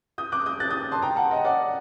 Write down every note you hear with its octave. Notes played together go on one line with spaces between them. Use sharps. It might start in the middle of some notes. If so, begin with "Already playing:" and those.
D#6 G6
D6 F#6
D#6 G6
F#6 A6
D#6 G6
A5 C6
G5 A#5
F#5 A5
D#5 G5
D5 F#5